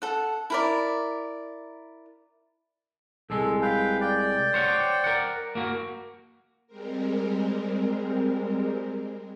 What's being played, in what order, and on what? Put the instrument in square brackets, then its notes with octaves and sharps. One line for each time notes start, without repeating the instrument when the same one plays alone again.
[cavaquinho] A4 F#5
E4 A#4 D5
[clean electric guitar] C2 G#3 [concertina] A4
[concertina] B4 F5 G5
D5 G5
[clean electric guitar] C5 C#5 F#5
A#4 F#5
A#3 F#4
[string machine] G3 G#3 C4 A#4